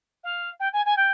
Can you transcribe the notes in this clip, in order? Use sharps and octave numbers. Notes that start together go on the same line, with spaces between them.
F5
G5
G#5
G#5
G5